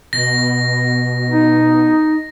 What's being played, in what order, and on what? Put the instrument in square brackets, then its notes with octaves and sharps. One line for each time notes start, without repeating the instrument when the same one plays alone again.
[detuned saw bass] B2 [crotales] A#6
[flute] D#4